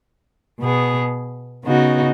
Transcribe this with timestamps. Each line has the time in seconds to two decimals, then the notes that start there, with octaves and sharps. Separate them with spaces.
0.61 B2 B3 G#4
1.65 C#3 B3 D#4 F#4